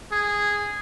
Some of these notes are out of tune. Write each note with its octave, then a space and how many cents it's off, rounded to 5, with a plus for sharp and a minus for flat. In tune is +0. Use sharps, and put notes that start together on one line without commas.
G#4 -10